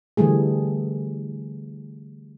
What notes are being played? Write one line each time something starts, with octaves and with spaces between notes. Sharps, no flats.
D3 E3 G3 A3 G#4